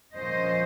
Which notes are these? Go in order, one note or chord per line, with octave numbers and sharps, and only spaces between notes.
A#2 F3 A#3 C#4 C5 D#5